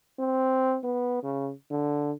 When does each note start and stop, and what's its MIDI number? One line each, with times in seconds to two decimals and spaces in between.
0.19 0.79 60
0.84 1.19 59
1.23 1.52 49
1.70 2.12 50